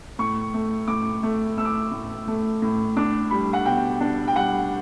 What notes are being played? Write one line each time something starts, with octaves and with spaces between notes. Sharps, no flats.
A2 C#6
A3
A2 D6
A3
A3 E6
D6
E6
A2
A3
A2
D4 D6
G3 B5
F#5
B2 G5
D4
G5
G3 F#5